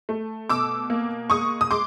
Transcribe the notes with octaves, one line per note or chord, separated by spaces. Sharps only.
A3
B2 D6 E6
A#3
G#3 C#6 D#6
D#6
G#3 C6 D6